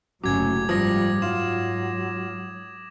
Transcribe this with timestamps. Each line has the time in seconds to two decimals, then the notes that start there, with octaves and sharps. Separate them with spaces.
0.24 F#1 C3 F#3 A3 C#4 D6 G#6
0.69 G#2 F3 G3 D#6 A#6
1.22 F#3 F4 E7